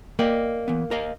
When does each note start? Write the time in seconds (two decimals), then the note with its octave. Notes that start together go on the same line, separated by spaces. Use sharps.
0.19 A#3 D5 D#5 G5
0.68 E3 B3
0.91 A#4 D#5 F5